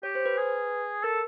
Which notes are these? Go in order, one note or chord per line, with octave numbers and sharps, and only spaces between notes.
G4 C#5
C5
B4
G#4
A4 A#4